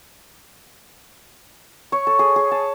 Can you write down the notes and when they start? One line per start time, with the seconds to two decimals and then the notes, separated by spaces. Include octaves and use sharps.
1.92 C#5
2.07 A4
2.19 G#4
2.36 G#4
2.51 A5